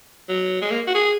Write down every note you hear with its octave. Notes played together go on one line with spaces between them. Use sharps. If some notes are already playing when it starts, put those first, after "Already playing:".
F#3
G#3
A#3
F#4
G#4